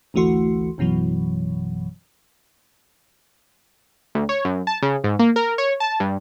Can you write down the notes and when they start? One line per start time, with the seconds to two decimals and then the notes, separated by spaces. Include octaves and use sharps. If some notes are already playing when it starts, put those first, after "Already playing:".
0.14 A1 D2 E3 A3 F#4 C6
0.78 A1 F#2 B2 E3 F#3
4.15 D2
4.29 C#5
4.45 F#2
4.67 A5
4.82 C#3
5.04 G#2
5.19 A#3
5.36 A#4
5.58 C#5
5.80 A5
6.00 G2